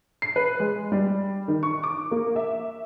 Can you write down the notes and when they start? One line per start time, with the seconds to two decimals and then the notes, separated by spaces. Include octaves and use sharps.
0.22 C7
0.36 B4
0.60 G#3
0.92 G3
1.48 D#3
1.63 C#6
1.83 D6
2.11 A#3
2.36 E5